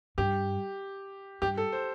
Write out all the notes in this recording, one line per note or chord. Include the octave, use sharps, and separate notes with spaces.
G2 G4
G2 G4
A4
C5